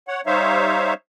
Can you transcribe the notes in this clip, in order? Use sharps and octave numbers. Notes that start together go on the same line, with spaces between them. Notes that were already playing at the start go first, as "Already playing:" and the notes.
C#5 F#5
G3 D#4 C5 C#5 E5 F5